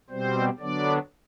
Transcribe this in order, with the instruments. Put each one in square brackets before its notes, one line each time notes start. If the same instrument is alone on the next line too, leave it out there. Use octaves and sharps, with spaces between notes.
[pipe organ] B2 G3 C4 C5
D3 F#3 B3 D4 D5